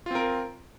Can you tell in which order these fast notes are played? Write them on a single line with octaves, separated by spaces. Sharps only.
F4 C4 A#4